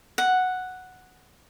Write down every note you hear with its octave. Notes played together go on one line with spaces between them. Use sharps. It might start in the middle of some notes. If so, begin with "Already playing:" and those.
F#5